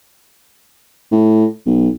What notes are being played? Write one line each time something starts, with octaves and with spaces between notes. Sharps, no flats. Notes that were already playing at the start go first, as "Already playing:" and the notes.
A2
B1